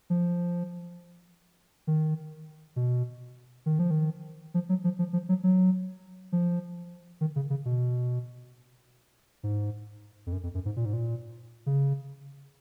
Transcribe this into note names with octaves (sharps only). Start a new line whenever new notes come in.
F3
D#3
B2
D#3
F3
D#3
F3
F#3
F3
F3
F3
F#3
F#3
F3
D#3
C#3
C#3
B2
G#2
F2
F#2
F2
F#2
G#2
A#2
G#2
A#2
C#3